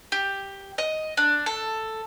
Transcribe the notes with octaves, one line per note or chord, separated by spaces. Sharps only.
G4
D#5
D4
A4